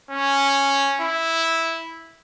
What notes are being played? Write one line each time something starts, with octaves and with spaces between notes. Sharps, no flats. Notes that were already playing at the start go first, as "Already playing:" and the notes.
C#4
E4